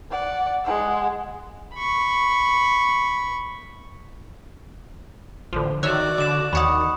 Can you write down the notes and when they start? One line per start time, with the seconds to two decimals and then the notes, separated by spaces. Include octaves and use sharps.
0.11 D5 F#5
0.64 G#3 F#5
1.74 B5 C#6
5.53 A1 D3 F3
5.83 D#3 F#4 C#5 D5 E5 F#6
6.18 D3 D6 E7
6.53 D#2 D#3 C#5 F#5 B5 C#6 D#6